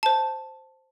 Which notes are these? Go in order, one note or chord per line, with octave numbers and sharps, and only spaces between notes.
C5 A5